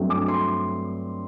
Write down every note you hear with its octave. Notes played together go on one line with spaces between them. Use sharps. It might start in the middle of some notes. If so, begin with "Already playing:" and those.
Already playing: G2 F#3 A3 C4
D6
C6